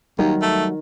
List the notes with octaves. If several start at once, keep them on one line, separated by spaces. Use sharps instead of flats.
D#2 D#3 F#3 G3
A3